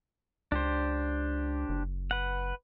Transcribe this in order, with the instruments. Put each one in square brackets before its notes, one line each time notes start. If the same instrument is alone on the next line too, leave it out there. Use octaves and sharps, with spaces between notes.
[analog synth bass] C#2 [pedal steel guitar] D4 G4 C5
[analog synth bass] F#1
[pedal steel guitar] B4 F#5